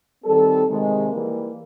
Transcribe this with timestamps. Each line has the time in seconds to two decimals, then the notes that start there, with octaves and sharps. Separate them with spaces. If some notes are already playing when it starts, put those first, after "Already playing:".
0.24 D#3 G3 C4 A4
0.66 C3 D#3 G#3
1.09 E3 G3 A#3